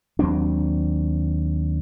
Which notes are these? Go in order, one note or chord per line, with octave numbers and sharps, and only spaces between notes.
D#2 F#3 C4 D4